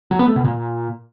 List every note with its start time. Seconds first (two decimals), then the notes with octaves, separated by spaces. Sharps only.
0.11 F#3
0.19 B3
0.28 A3
0.36 B2
0.44 A#2